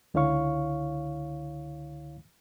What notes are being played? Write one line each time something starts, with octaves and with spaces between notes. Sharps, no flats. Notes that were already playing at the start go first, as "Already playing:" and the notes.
C#2 D3 E4 C#5 F5 C#6